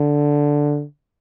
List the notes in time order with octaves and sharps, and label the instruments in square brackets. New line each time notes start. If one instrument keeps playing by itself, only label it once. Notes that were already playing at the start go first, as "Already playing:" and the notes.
Already playing: [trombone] D3